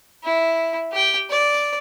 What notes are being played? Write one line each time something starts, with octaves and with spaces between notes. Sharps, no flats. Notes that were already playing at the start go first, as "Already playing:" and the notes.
E4
G4 G5
D5